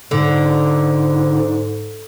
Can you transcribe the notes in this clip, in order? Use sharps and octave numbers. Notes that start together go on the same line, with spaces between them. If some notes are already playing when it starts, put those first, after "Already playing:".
G#2 D3